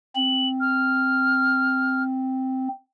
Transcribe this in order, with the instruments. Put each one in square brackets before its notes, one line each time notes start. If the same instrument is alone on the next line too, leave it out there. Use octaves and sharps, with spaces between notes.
[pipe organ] C4 [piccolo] F#7
[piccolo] F6